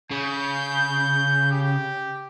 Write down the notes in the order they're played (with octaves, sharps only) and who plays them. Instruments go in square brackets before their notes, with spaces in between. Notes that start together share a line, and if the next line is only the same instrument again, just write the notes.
[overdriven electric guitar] C#3 [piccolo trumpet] G6
[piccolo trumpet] G4